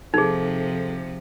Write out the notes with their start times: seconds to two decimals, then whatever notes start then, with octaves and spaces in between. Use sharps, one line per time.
0.14 C3 F3 D#4 G#4 A4